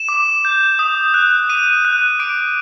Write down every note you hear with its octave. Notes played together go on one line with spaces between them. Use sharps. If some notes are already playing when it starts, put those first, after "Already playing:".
Already playing: E7
D6
G6
D#6
F#6
D#6 D#7
F#6
D6 D7